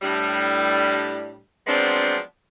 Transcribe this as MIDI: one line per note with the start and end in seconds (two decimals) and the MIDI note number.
0.02 1.39 45
0.02 1.39 55
0.02 1.39 62
1.67 2.18 53
1.67 2.18 54
1.67 2.18 56
1.67 2.18 59
1.67 2.18 60
1.67 2.18 62